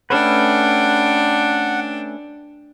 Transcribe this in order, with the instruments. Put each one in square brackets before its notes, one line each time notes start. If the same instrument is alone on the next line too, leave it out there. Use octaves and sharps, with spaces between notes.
[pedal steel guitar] A3 C#4 B4 [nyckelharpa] D4 G5 [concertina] F#5